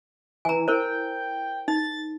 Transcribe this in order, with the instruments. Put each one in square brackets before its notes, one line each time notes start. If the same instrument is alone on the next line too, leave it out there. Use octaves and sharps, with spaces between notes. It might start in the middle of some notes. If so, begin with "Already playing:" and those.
[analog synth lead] E3 [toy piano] G#5 A#5
[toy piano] E4 A#4 C5 [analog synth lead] G5
[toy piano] D#4 [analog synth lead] A6